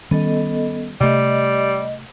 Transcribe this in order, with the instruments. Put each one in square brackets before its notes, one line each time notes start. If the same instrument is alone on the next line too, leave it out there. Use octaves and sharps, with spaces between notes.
[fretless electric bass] D#3 G3 C#4 [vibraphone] B3 A4 D#5
[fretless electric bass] C3 A3 [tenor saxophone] G3 [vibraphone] D#5